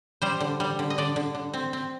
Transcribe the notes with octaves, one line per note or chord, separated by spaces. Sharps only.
G3 C5
D3
G3
D3
D#5
D3 D5
D3
D3
C4
C4